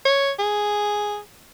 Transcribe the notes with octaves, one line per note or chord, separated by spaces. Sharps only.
C#5
G#4